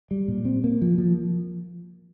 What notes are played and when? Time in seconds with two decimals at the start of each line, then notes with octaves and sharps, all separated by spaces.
0.11 G3
0.28 A#2
0.45 C4
0.64 A#3
0.82 F3
0.98 F3